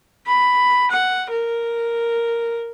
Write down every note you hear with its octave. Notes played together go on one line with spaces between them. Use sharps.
B5
F#5
A#4